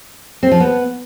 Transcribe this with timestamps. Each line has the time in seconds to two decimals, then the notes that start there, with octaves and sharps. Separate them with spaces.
0.43 C4
0.51 F3
0.60 B3